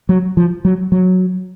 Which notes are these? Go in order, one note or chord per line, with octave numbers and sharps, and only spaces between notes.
F#3
F3
F#3
F#3